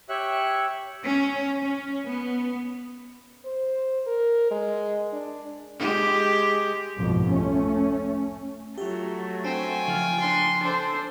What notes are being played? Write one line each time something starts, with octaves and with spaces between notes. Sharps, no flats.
G4 C#5 E5 F#6
C#4
C#4
B3
C5
A#4
G#3
D4
G#3 G4
C2 F2 G#2 B2
A3 C#4
F#3 A3 F4 G4
C4 D4 C5 G5 G#5
C#3 F3 F4
D4 C6
D4 A4 C5